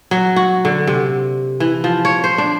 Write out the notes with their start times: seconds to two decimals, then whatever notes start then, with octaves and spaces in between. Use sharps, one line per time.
0.11 F#3
0.36 F#4
0.65 D3
0.87 C3
1.60 E3
1.84 F3
2.05 C#5
2.24 C5
2.38 D4